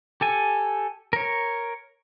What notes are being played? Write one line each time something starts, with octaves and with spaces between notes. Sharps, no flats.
G4 A4 G#5
A#4 C#5